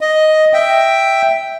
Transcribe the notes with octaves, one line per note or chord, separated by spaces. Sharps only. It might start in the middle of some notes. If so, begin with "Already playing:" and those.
D#5
E5 G5